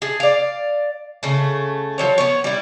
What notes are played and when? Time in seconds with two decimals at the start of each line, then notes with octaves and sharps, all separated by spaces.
0.02 G#4 A5
0.20 D5 F5
1.23 C#3 A3
1.98 F3 F#3 C#5
2.18 B3 C#5
2.44 G3 E4